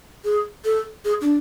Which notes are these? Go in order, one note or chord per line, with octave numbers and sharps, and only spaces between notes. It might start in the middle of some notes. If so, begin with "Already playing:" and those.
G#4
A4
G#4
D4